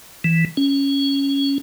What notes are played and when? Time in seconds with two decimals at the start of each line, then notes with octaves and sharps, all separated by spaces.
0.24 E3
0.57 C#4